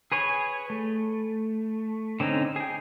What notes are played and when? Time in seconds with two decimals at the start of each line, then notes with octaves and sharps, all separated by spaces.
0.12 G#4 B4 C#5 G#5
0.70 A3
2.20 D3 C4 C#4 D#4
2.56 G#4 G5